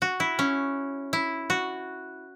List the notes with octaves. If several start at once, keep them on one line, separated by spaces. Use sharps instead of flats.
F#4
E4
C#4
E4
F#4